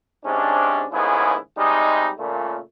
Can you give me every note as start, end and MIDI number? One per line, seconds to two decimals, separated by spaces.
0.25 0.85 44
0.25 0.85 48
0.25 0.85 61
0.25 0.85 62
0.93 1.35 39
0.93 1.35 44
0.93 1.35 49
0.93 1.35 59
0.93 1.35 64
0.93 1.35 68
1.58 2.10 48
1.58 2.10 55
1.58 2.10 56
1.58 2.10 63
2.19 2.58 46
2.19 2.58 49
2.19 2.58 57